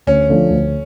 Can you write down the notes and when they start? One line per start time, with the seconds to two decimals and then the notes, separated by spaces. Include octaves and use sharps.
0.07 D2 C#4
0.30 D3 F3 A3 D4
0.50 D2